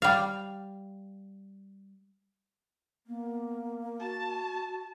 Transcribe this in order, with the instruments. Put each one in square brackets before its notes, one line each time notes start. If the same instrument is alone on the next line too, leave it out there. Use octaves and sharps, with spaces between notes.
[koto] G3 F5
[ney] A#3 [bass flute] B3
[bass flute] F#4 [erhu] A5